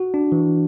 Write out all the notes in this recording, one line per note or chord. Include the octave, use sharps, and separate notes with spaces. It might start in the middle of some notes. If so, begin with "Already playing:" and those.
Already playing: F#4
D4
E3